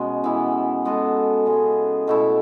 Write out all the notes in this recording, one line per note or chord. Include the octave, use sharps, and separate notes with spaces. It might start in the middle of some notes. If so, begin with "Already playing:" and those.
Already playing: B2 G#3 C#4
E3 B3 E4
G#3 B3 F#4 A4
C#3 G#3 C#4 G#4
B2 A3 E4